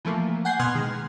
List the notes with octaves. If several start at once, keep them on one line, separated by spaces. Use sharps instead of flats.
E3 F3 A3 A#3
F#5 G#5 G6 C7
B2 B3 C6 F6 F#6 G#6
D#3 G#3